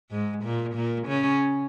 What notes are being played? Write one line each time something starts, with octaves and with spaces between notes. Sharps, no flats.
G#2 G#3
A#2 A#3
A#2 A#3
C#3 C#4